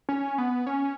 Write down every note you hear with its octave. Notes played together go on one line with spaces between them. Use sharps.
C#4
B3
C#4